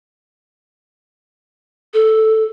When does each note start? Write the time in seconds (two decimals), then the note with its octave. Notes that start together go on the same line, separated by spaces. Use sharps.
1.94 A4